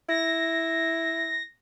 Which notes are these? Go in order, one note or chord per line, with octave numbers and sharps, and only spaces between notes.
E4 A#6